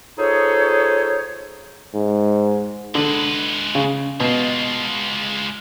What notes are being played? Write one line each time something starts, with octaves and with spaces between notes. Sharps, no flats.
D#4 F4 G#4 A4 C5 C#5
G#2
D3 G#3 B4
C#3
B2 G#3 F4